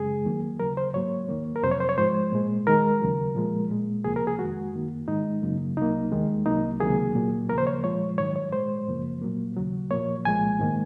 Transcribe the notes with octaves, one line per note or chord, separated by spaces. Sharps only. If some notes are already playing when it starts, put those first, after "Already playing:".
Already playing: F#2 C#3 G#3 G#4
D#2 D#3 F#3 A#3
D#2 C#3 F#3 A#4
C5
G#2 F#3 A#3 C#5
D#2 D#3 A#3
A#4
F2 C3 F#3 C5
C#5
C5
C#5
G#2 F3 G#3 C5
A#2 G#3
D#2 D#3 G#3 A#4
D#2 C#3 F#3
A#2 F3 G#3
A#2 G#3
C#2 C3 F3 A#3 G#4
A#4
G#4
F2 D#3 G#3 F#4
F#2 D#3 A#3
G#2 D#3 G#3 D#4
F#2 C#3 F#3 A#3
C2 C3 F#3 A#3 D#4
D#2 D#3 G#3
C2 C3 F#3 A#3 D#4
C#2 C3 D#3 F#3 A#3 G#4
A#2 F#3 A#3
D#2 C#3 F3 A#3 A#4
C5
C#5
A#2 F3 G#3 C#5
G#2 D#3 F#3 C#5
C#5
A#2 G#3 C5
F#2 C#3 F3 A#3
A#2 F#3 A#3
D#2 C#3 F#3
A#2 F3 A#3 C#5
C2 A#2 F3 G#3 G#5
G#2 D#3 A#3